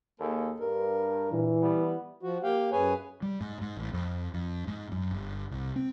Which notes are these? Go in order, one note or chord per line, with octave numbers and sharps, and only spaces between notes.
D#2 A#3 G#4 A4
G2 A#4
A#2 E3
G3 B3 E4
F3 F#4
A#3 G4 F5 G5
F#2 G#4 B4 C#5 G#5
G3
G#2
G#2
A1
F2
F2
G#2
F#2
G1
C2
C4